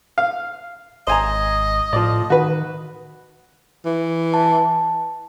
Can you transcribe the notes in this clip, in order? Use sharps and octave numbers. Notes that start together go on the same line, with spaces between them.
F5
G#1 C5 D#5 G#5 A#5
A2 F3 D5
D#3 F#4 B4
E3
A5